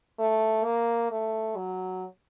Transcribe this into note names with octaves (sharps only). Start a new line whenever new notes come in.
A3
A#3
A3
F#3